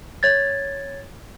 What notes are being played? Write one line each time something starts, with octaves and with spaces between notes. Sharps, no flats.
C#5 G#6 A6